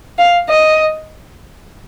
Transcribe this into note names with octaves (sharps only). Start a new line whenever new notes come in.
F5
D#5